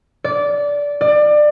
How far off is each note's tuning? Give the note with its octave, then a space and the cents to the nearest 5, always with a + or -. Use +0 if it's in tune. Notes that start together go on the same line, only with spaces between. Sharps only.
D5 -15
D5 +25